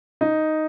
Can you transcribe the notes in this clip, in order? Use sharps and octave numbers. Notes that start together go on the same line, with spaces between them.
D#4